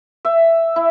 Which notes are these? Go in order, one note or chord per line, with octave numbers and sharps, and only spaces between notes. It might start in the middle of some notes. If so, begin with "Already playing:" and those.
E5
E4